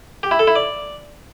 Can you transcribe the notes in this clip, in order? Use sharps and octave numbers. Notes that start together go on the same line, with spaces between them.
G4
E4
A4
E4
D5